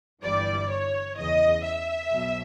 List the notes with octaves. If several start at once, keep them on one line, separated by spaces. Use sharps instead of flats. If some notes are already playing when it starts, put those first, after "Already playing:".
G1 G2 E3 G3 D5
C#5
E2 C#3 E3 D#5
E5
B1 B2 F#3